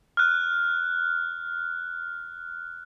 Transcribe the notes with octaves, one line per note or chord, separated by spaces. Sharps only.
F6 F#6